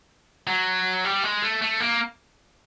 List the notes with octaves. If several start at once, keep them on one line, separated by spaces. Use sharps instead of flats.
F#3
G3
G#3
A3
A3
A#3